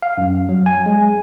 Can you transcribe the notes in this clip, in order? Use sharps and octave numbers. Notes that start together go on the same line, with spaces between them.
F5
F#2
F#3
G#5
G#3